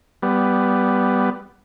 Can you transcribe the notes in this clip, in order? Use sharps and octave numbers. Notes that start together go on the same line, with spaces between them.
G3 B3